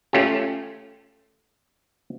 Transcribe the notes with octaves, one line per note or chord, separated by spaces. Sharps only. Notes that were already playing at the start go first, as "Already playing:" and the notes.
A3 C#4 F4 G4